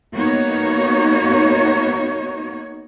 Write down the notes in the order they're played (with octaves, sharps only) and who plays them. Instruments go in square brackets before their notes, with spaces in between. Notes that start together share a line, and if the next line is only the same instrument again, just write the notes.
[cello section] A#3 B3 D#4 F#4 C#5